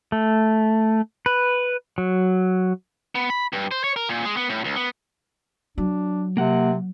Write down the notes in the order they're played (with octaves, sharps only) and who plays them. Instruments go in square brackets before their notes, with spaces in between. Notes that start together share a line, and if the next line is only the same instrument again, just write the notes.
[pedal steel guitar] A3
B4
F#3
[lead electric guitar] B3
B5
G2
C5
C#5
A#4
A#2
G#3
B3
A2
C#2
B3
[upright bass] F#3 [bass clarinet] D4
[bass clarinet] C3 [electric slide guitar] A#3 F#5